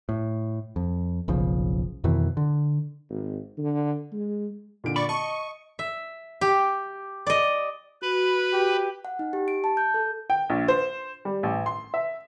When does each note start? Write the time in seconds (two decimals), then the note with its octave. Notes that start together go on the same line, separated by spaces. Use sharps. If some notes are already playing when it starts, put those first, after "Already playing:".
0.09 A2
0.76 F2
1.28 F#1 B1 C#3 F3
2.04 F2 B2 D#3 E3
2.37 D3
3.09 G#1
3.58 D3
4.13 G#3
4.84 A#2 D3 D7
4.96 D5 B5 C#6
5.09 D#5 A5 C#6
5.79 E5
6.41 G4
7.27 D5 D#5
8.02 F#4 B4 B5
8.53 G4
9.05 F#5
9.19 D#4
9.33 G4
9.48 D7
9.64 A5
9.77 G6
9.94 A4
10.30 G5
10.50 A#1
10.68 C5
11.25 G3
11.43 A1
11.66 C6
11.94 E5